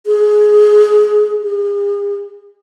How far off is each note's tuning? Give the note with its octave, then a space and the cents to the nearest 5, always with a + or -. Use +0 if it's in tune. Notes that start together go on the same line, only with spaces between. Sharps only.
G#4 +15
G#4 -40